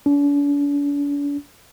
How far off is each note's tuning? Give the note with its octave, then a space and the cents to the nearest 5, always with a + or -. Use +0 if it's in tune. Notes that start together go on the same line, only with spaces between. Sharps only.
D4 -45